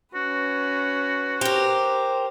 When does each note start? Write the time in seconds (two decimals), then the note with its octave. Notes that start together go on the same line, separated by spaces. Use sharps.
0.15 C#4 F#4 B4
1.41 G4 A#4 C5